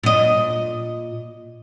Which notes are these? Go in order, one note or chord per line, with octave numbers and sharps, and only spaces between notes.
A#2 D#5